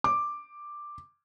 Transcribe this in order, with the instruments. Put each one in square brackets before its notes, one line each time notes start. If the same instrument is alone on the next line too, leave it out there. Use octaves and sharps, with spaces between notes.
[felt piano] D6